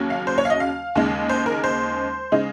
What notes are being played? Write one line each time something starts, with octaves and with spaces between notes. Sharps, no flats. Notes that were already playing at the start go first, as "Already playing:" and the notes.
Already playing: D#2 C#3 F#3 C#4
F5
C5
C#5
F5
D#5
F5
D#2 C#3 G#3 D#4
C5
A#4
C5
C#3 G#3 D#4